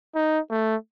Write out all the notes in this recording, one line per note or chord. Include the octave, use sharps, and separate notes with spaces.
D#4
A3